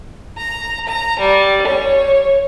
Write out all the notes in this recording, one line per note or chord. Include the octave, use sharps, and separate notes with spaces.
A#5
A#5
G3
C#5